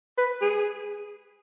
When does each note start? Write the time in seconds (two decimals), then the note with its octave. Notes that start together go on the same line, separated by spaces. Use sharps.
0.18 B4
0.41 G#4